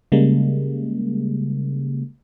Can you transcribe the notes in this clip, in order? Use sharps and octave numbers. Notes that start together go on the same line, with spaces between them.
C#3 G3 G#3 A#3